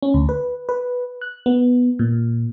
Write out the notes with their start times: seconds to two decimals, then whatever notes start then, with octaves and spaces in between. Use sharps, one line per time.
0.03 C#4
0.14 D2
0.29 B4
0.69 B4
1.21 F#6
1.46 B3
1.99 A#2